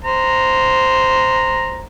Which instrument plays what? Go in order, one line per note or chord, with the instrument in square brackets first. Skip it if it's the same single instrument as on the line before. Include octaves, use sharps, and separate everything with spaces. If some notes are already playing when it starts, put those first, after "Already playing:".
[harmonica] C5 A#5